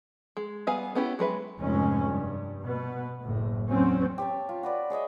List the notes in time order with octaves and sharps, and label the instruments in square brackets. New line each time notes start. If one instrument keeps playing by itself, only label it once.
[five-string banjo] G#3
G3 B3 G#4 F5 G#5
B3 C#4 E4 G4
F#3 G#3 B4 E5
[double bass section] F1 F2 G#2 G#3 C#4
G2
B2 B3
F#1 A2
E2 F#3 C4 C#4
[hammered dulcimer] G4 C#5 A5
F4
F#4 B4 D5
G#4 C#5 D#5 E5